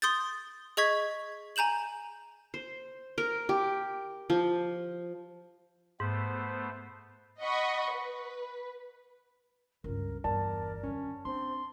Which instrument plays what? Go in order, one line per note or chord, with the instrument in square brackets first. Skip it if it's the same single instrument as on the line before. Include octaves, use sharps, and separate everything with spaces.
[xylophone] C6 D#6 G6 A6
G#4 D#5 C#6 G#6 B6
G#5 A#5 G6 E7 F#7
[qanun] C5
A#4
G4
F3
[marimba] G#2 [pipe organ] A3 B3 C5
[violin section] D#5 F#5 B5 C#6
B4
[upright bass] C#2 G2 [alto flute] A#4
[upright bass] G1 E2 [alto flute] A#4 [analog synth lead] D5 [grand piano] A5
[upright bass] F#2 D3 [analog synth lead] C#4
[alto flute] C4 [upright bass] D4 [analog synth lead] C6